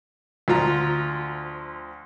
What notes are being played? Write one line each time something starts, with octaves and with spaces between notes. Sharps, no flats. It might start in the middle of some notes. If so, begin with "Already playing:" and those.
D2 F3 F4 A#5